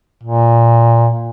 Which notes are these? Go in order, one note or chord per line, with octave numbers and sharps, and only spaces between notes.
A#2